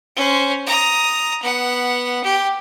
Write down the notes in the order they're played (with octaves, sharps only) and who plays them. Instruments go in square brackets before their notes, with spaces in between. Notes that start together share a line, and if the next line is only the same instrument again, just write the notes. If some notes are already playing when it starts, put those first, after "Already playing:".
[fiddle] C#4 C5
A#5 D#6
B3 F#5
G4